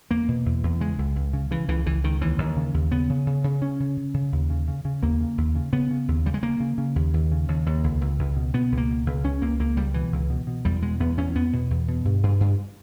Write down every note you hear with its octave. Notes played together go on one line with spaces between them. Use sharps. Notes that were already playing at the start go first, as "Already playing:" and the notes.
E2 A#3
B2
E2
E2
C#3 G#3
C#2
C#2
C#3
C#3 E3
C#2 E3
C#2 E3
C#2 D#3
D#2 E3
D#2
C#3
D#2
C#3 B3
C#3
C#3
C#3
C#3 C#4
C#3
C#3
C#3
D#2
C#3
C#3
C#3
D#2 A#3
C#3
D#2
C#3
C#3 B3
C#3
D#2
C#3 G3
G#3
C#3 A#3
C#3
C#3
D#2
D#2
C#3
D#2
D#2
C#2
C#2
C#2
B2
B2 B3
C#2
A#3
B2
C#2
C#2 C#4
C#2 A#3
C#2 A#3
C#2 G3
B2 E3
C#2
B2
B2
E2 G3
B2 G#3
E2 B3
E2 C#4
E2 B3
B2
E2
B2
G2
G2
G2